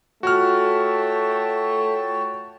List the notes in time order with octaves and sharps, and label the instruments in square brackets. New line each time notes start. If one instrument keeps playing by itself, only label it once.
[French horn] A3 [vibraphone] F4 [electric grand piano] F#4 F6 [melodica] C#5 G5 A5